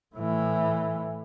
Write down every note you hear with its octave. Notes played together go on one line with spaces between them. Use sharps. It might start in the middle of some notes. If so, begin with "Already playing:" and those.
A2 E3